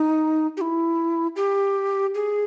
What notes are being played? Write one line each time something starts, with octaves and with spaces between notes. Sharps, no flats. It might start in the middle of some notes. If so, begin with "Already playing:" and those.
Already playing: D#4
G4
E4
G4
G#4